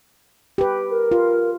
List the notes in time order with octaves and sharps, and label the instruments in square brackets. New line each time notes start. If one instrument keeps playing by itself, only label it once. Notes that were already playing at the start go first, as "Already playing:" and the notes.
[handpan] G4 B4
[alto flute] A#4
[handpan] F4